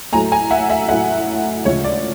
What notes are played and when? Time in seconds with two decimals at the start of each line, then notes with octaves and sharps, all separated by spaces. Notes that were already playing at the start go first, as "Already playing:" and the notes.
0.12 A2 F#3 A3 G#5 A#5
0.32 G#5 A#5
0.51 E5 F#5
0.69 E5 F#5
0.89 A2 F#3 A3 E5 F#5
1.65 D2 C#3 F3 G#3 C#5
1.84 D5